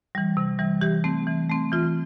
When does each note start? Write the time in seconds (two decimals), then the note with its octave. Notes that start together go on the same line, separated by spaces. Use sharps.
0.15 E3 G3
0.37 C3
0.59 E3 G3
0.81 E3 G4
1.04 A3 C4
1.27 E3
1.50 A3 C4
1.72 E3 F4